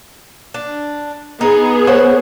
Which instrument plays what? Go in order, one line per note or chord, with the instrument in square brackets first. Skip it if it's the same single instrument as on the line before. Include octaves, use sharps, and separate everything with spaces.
[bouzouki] D4
[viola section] B3 G#4 [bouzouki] D#4
[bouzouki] C5 C#5 F#5